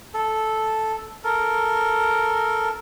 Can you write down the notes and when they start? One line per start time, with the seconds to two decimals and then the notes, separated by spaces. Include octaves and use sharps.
0.14 A4
1.24 A4 A#4